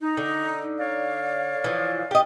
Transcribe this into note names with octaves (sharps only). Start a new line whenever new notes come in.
D#4
D3
C#5 D5 F5
E3 F3
G4 D#5